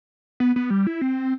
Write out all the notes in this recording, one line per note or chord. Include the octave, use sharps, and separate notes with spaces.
B3
B3
G3
E4
C4